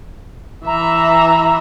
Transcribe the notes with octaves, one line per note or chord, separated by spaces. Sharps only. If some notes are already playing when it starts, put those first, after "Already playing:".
E3 E5 A#5